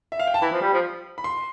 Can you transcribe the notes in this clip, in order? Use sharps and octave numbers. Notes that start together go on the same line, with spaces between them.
E5
F5
G5
A5
E3 B5
F3
G3
F3
B5
C6